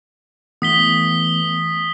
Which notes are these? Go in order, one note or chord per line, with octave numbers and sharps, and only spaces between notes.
E3 A3 B3 D#6 B6 G7